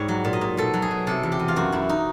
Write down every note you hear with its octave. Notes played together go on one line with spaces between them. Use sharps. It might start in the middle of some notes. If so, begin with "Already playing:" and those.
Already playing: G#2 G3 C#5
F#3
A#2
D#5
A#2
B2 A4
F#3
G#4
B2
C3 A4
E2
G4
E2
F4
F#2 F#4
F#2 E4
D#4